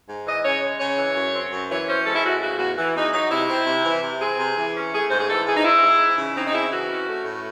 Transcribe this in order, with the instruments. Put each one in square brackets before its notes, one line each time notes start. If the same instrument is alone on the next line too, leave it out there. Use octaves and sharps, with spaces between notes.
[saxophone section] G#2
E3 D#5
C#3 C#5
G#3
C#3 C#5
E3
F#2
C4
F#2
E3 C#5
C#4 C5
G#3 A4
E4
A2 F#4
C#3 F#4
E2 F#4
E3
E2 D#4
F#3 D#4
C3 E4
C4
C3
E3
C3
C4 G#4
C3
E3
C#4
A3 G#4
G#2 C5
G#4
E3 A4
G#2 G#4
D#4
C4 E4
G#2
E3
C#3
C4 D#4
D#4
C#3 E4
E3 F#4
C#4
A3
A2